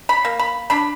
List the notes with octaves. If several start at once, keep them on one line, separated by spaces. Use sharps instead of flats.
B5
A#3
B5
D4 B5